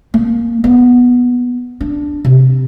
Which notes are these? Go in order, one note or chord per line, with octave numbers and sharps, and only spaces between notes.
A#3
B3
D4
C3